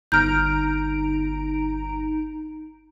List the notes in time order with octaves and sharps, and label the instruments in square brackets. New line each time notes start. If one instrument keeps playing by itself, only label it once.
[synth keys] G1 A#5 D7 [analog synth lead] D#4 [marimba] F6 G6